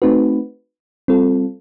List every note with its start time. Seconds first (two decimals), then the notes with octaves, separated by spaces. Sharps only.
0.02 A3 C4 D#4 F#4 B4
1.08 G3 C4 F4 A4